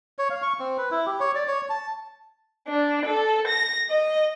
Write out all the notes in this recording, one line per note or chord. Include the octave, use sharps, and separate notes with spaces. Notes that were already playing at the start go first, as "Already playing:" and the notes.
C#5
F5
C#6
C4
B4
E4
G4
C#5
D5
C#5
A5
D4
A4
A#6
D#5